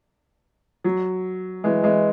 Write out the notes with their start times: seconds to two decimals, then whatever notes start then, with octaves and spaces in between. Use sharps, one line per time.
0.84 F#3
1.64 E3 G#3
1.83 E3 G#3